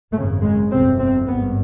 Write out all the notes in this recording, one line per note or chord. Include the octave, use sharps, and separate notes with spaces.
G#1 F#2 C#3 A3
G#3
G1 F2 C3 C4
C4
G#1 G2 B3